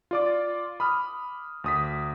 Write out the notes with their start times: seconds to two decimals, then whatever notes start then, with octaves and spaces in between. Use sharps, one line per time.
0.11 F4 D5 D6
0.80 B5 D#6 F6
1.64 D2 D#6 B6